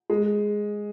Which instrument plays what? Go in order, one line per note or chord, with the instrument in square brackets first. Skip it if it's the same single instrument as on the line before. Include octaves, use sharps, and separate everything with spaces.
[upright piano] G#3